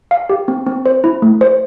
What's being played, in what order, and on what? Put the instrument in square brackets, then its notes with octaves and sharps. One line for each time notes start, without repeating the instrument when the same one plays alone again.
[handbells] F5
G4
C4
C4
C5
E4
A3
C5